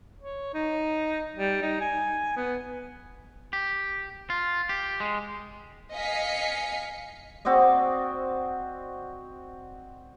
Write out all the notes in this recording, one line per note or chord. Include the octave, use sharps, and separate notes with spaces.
C#5
D#4
G3
D#4
G#5
B3
G4
F4
G4
G#3
D#5 F5 G#5 B6 C#7
C4 F#4 D5 D#5